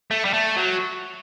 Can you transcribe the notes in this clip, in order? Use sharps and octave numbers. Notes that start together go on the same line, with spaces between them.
A3
G3
A3
F#3